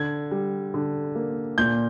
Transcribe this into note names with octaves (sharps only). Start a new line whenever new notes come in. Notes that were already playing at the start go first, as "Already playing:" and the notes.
Already playing: D3 G#6
G3
D3
A#3
A#2 G6